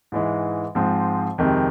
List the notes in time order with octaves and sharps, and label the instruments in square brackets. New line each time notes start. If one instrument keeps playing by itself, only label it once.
[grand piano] G#2 E3 G#3
G#2 F3 G#3 C4
F2 C3 D#3 G#3